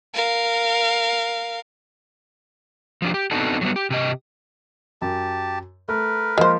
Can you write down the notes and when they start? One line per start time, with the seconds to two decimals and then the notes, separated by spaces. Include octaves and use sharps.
0.14 A#4 F5
3.02 F3 D4 G4
3.14 G4
3.31 B3 C4 D4 D#4 F#4 A4
3.61 F#3 G3 B3
3.76 G4
3.90 C3 G4 D#5
5.02 F#2 G4 A5
5.89 A3 A#4 B4
6.38 F3 G#3 A#3 C5